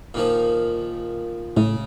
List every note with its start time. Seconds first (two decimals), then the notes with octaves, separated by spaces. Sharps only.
0.14 A#2 D#3 F3
1.57 A2 C#3